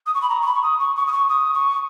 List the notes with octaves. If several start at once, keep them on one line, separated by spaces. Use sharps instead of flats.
D#6
C#6
B5
A#5
C#6
B5
C#6
D#6
C#6
C#6
D#6
C#6
D#6
C#6